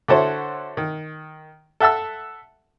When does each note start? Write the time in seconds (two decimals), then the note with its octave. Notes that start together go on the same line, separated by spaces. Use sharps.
0.08 D3 E4 F#4 A4 C5 C#5
0.77 D#3
1.80 A4 E5 F#5 A5 E6